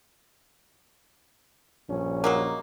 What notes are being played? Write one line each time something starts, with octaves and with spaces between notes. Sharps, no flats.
A#1 G2 C#4
F#3 G#3 A#3